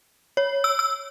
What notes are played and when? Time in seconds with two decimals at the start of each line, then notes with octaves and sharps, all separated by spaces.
0.37 C#5
0.64 E6
0.79 E6